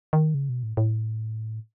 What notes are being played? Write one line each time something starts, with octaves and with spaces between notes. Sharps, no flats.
D#3
C#3
B2
A2
A2